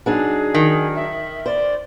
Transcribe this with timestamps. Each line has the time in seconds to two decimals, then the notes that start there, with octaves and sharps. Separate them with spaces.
0.06 F#3 D4 D#4 G#4
0.54 D#3
0.96 E5
1.46 C5 D5